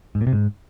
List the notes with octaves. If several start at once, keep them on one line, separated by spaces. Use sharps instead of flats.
G#2
A#2
C3
G#2